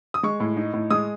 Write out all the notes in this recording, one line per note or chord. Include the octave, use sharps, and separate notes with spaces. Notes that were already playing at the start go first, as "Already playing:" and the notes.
D#6
G#3 C#6
A2
D#4
A2
G#3 D#6